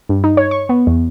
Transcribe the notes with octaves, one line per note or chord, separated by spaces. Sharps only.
G2
D#4
C#5
C#6
B3
E2